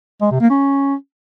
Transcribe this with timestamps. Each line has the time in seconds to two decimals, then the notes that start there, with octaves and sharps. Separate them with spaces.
0.22 G#3
0.31 C3
0.41 A#3
0.50 C#4